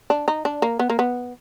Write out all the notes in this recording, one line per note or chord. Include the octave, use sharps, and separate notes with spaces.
D4
D#4
D4
A#3
B3
A#3
B3